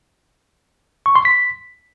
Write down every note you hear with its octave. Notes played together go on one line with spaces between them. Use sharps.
C#6
C6
B6